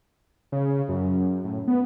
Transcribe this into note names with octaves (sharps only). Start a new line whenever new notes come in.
C#3
F#2
A2
B3